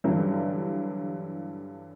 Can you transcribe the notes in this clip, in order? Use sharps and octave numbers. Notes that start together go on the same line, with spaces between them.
G2 D3 E3 F#3 G3